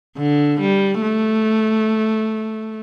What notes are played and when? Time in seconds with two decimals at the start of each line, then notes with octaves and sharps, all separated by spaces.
0.18 D3
0.61 G3
1.02 A3